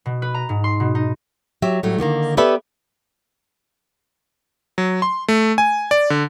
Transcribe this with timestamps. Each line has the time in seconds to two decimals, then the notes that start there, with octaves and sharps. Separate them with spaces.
0.06 B2
0.22 B4
0.34 A#5
0.49 G#2
0.64 C6
0.80 B2
0.95 D#4
1.62 F#3 G4 E5
1.83 A2 F#3 G3 A3
1.98 D3 D#3 A3 A#3
2.37 B3 G4 A4 B4 D5 E5
4.78 F#3
5.02 C6
5.28 A3
5.58 G#5
5.91 D5
6.10 D3